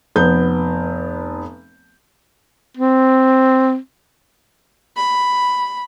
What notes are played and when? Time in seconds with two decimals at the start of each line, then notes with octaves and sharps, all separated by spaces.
0.16 F1 B3 G6
2.77 C4
4.96 B5